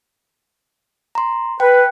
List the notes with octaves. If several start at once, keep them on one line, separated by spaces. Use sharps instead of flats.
A#5 C6
B4 G5